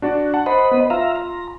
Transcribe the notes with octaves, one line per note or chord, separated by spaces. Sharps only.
D4 F#4 D5
F#5 A5
C5 D#5 B5
B3
F4 E5 F5 A#5
A#5